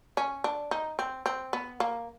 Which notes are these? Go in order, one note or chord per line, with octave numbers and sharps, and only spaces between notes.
C#4
D4
D#4
C4
C4
B3
A#3